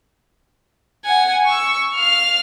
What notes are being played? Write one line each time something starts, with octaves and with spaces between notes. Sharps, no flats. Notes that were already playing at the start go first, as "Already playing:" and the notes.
F#5 G#5
C#6 E6
F5 F6